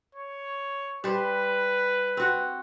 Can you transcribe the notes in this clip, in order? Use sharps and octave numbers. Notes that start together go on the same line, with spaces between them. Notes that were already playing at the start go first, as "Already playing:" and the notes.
C#5
G3 B4 C5
C4 F#4